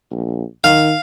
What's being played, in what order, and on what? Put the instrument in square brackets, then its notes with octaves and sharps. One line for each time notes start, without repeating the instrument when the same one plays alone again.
[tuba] A#1
[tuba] D#3 [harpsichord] F5